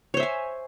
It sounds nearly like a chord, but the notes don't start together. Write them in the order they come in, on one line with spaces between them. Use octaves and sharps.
C#5 C5 E5 G#5